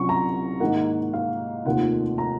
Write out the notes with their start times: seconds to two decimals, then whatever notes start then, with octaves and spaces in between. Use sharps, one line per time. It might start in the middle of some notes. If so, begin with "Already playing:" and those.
Already playing: C2 C3 F#3 C#4 F4 C#6
0.09 A#5
0.60 G#2 D#3 A#3 F#5
1.14 F5
1.65 F1 D#2 D#3 A#3 F4 F#5
2.18 A#5